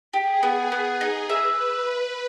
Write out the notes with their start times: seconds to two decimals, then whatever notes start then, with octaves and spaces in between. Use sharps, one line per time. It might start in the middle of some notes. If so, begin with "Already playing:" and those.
0.14 G4 G#4
0.43 B3
0.72 B3
1.01 D#4
1.30 B4 E5